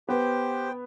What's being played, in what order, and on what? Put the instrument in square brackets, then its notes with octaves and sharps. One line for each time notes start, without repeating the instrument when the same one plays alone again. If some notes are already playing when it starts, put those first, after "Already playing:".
[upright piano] B3 [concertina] G4 C5 G5